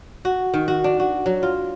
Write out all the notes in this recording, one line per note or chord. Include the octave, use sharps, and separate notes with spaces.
F#4
D#3
F#4
D4
F#4
F#3
F4